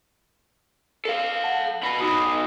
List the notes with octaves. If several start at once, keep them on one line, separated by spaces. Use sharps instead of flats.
A4 F5
F#5 A5
B2 B5
B2 D#4 F#4 B5 D#6